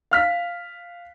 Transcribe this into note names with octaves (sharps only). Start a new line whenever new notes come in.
F5 F6 B6